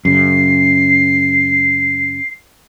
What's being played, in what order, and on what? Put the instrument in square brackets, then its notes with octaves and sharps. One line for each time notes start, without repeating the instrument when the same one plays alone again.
[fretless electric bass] F#2 C#3 [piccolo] C7